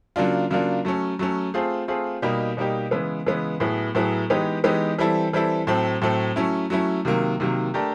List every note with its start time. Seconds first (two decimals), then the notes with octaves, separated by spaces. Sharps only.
0.16 C#3 F#3 A#3 D4 F4
0.50 C#3 F#3 A#3 D4 F4
0.85 F#3 A3 C#4
1.19 F#3 A3 C#4
1.54 A3 C4 F4 G#4
1.88 A3 C4 F4 G#4
2.22 B2 G3 A#3 D#4 G4
2.57 B2 G3 A#3 D#4 G4
2.91 C#3 E3 G#3 B3
3.26 C#3 E3 G#3 B3
3.60 A2 F#3 B3 E4 G#4
3.95 A2 F#3 B3 E4 G#4
4.30 E3 G#3 B3 D#4 G4
4.64 E3 G#3 B3 D#4 G4
4.98 E3 G3 C4 E4 A4
5.33 E3 G3 C4 E4 A4
5.67 A2 F#3 A3 C4
6.02 A2 F#3 A3 C4
6.36 F#3 A3 C#4 E4
6.70 F#3 A3 C#4 E4
7.05 C3 D#3 F#3 A#3
7.40 C3 D#3 F#3 A#3
7.74 A3 D4 G4 A#4